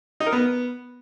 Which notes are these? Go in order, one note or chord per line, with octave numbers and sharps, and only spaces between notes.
D#4
A#4
B3